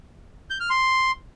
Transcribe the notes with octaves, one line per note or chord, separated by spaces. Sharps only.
G6
F6
C6